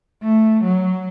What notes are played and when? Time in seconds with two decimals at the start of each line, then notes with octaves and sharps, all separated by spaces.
0.23 A3
0.64 F#3